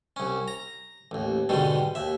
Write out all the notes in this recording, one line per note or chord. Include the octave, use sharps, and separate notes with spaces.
C2 C#4
A#5
A1 D#2
G#2 B2 D3 D#3 G3
D#2 E5